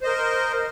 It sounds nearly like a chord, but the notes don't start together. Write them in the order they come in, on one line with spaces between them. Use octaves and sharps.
C5 D#5 A#4